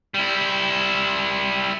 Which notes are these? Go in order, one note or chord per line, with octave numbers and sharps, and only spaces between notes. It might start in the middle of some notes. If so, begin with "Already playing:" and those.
G3 E4